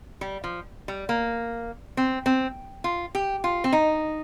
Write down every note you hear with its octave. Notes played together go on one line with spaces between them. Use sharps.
G3
F3
G3
A#3
C4
C4
F4
G4
F4
C4
D#4